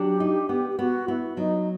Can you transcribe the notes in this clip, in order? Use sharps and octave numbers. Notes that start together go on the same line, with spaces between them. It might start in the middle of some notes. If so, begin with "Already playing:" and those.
Already playing: F#3 D4 G4
D#4
B3
G4
B3 F#4
B3 E4
F#3 D#4